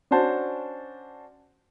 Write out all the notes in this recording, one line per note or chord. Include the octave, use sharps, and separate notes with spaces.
C#4 D4 F#4 C5 A5